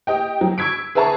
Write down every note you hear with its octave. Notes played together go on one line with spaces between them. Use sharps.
G4 D#5 G5
F#3
C#6 E6 G#6 B6 D7
G#4 B4 E5 A5 A#5 C#6